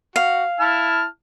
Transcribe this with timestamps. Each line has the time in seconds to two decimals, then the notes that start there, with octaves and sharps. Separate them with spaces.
0.16 F#4 F5
0.60 E4 A5 F6